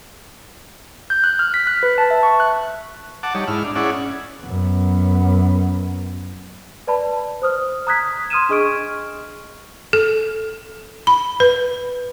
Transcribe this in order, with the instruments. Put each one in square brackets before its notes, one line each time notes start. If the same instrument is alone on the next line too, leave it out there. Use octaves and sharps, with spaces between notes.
[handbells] G6
F#6
F6
B6
F#6
B4
A5
E5
C#6
F#6
[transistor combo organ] F#5 A5 D6
G3 D#4 C#5
G#2 E4 F6
D4
C#4 E4 G#4 D5 F#5
[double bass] F#2 B3
[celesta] B4 D5 A5 B5
C5 D#6 F6
A#5 D#6 F#6 G#6 B6
C6 D#6 F6 G#6 D#7 E7
D4 G#4 D#5 C#6 F6 D7
[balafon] A4
B5
B4